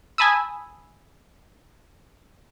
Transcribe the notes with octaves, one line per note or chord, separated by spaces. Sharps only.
G#5 A5 B5 D#6 E6